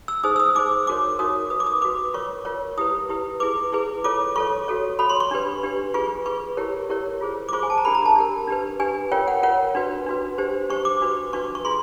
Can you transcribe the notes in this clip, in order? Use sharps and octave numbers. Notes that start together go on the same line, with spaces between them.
E6
D#4 G#4 C5 D#6
E6
D#6
D#4 G#4 C5 D6
D#4 F#4 A#4 C#5 D6
D#4 F#4 A#4 C#5 D#6
F#4 B4 D#6
D6
D#6
F#4 B4 D6
F4 A#4 C#5 C#6
F4 A#4 C#5
E4 G4 B4 D#6
E4 G4 B4
E4 G#4 B4 D6
E4 G#4 B4
F4 A4 C#5 D6
F4 A4 C#5 C#6
F#4 A4 C#5
F#4 A4 C#5 B5
C6
C#6
D4 G4 B4
D4 G4 B4
F4 G#4 B4 C#6
F4 G#4 B4 C#6
E4 G4 A#4 C#5
E4 G4 A#4 C#5
F4 G#4 C5
D6
F4 G#4 C5 C#6
G#5
A5
A#5
D4 G4 A#4 B5
A#5
A5
D4 G4 A#4
D4 G4 B4
D4 G4 B4 G#5
F4 A#4 C#5 G5
F#5
F4 A#4 C#5 F#5
D4 F#4 B4
D4 F#4 B4
D4 G4 C5
D4 G4 C5 C#6
D6
D4 F#4 B4
D4 F#4 B4 C#6
C#6
F4 G#4 B4 C6